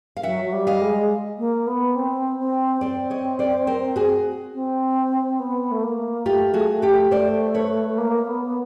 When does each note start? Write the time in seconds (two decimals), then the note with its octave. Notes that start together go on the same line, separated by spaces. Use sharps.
0.16 F5
0.23 F#3 E5 F#5
0.44 F#3
0.52 G3
0.67 D#5 F5
0.81 G#3
1.38 A#3
1.67 B3
1.95 C4
2.39 C4
2.81 C4 C5 D5
3.10 C#5 D#5
3.39 C5 D5
3.67 A#4 C5
3.96 F#4 G#4
4.54 C4
5.39 B3
5.71 A3
5.83 A#3
6.25 A3 F4 G4
6.54 F#4 G#4
6.82 G4 A4
7.11 A3 C5 D5
7.54 B4 C#5
7.98 A#3
8.26 B3
8.44 B3